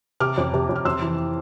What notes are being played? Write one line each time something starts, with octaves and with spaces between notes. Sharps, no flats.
C3 D6 F6
F2
C3
F2
F6
F2 C6 E6
E3